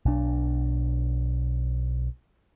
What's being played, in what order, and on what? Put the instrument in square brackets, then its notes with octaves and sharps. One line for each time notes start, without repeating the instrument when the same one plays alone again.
[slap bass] B1 D4